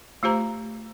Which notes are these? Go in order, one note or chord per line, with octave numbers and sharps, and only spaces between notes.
A3 F4 G4 C5 A#5